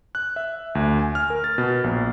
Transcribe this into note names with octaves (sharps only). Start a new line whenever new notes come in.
F#6
E5
D2
G#5
F6
A#4
A6
B2
A#1